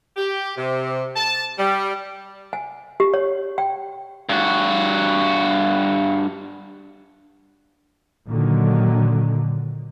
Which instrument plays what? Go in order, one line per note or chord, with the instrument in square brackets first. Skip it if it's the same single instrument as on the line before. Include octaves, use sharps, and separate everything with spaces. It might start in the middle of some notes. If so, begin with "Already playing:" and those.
[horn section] G4
C3
A5
G3
[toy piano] G#5
G4
C#5
G5
[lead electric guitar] G2 F#4
[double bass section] A#2 D3 D#3 F#3